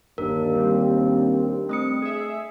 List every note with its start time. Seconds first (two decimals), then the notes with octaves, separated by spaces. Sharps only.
0.18 G1 D#2 D4 A#4
0.55 G3 C4 D4
1.69 A3 D#6 C#7
2.02 G#4 E5